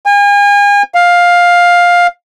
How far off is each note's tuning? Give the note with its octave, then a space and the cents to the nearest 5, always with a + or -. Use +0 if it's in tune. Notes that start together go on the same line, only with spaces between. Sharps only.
G#5 -40
F5 +10